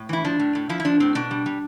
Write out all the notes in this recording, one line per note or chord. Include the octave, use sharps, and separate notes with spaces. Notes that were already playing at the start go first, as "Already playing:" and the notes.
Already playing: A2
E3 E4
F3 D4
A2
A2
F3 E4
E4
F3 D4
A2 C4
B2 D4
G3
G3